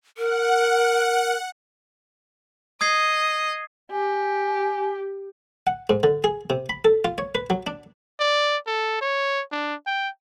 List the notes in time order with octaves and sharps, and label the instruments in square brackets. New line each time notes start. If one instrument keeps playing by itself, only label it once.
[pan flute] A#4 [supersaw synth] F#5
[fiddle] D#5 [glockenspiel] D#6 G#6 C7
[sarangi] G4 [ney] G#5
[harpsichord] F#5
G#2
D3
G#4
C3
B5
A4
F4
C#5
B4
F#3
D4
[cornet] D5
A4
C#5
D4
G5